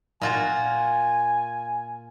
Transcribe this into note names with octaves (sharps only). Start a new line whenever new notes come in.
A#2 F4 F#4 G#5